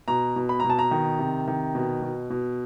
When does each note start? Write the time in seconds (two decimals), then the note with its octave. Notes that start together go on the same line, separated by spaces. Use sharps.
0.08 B2 A#5
0.36 B2
0.49 B5
0.60 A#5
0.64 B2
0.70 A5
0.79 A#5
0.91 D#3
1.19 C3
1.48 D#3
1.75 B2
2.02 B2
2.30 B2